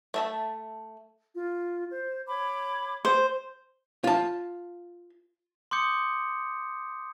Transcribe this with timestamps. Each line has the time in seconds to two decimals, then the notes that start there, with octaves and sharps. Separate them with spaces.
0.14 A3 E5 A5
1.35 F4
1.90 C5
2.28 C#5 B5 D6
3.05 C5
4.04 F4 A5
5.71 C6 D6 D#6 G6 C#7